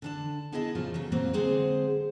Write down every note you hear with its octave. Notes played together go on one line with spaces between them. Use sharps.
D3 D4 A5
B3 E4 G#4 D#5 A5
A#2 C#3 F3 A3 F4
C#3 E3 F#3
A#2 F#3 A#3 C4
D3 G#3 C4 G#4 C5 F#5